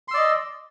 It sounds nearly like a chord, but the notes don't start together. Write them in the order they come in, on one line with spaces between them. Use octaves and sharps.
C6 E6 D5 D#5